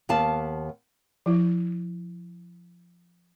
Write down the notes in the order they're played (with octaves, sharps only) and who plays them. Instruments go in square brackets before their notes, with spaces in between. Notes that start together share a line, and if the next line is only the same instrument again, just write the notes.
[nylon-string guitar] D#2 B3 F5 A5
[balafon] F3 E4